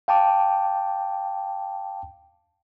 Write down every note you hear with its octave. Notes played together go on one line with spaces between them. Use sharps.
F5 G5 A5 D6